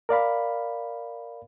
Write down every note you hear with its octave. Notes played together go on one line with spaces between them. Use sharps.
A#4 D5 F5 B5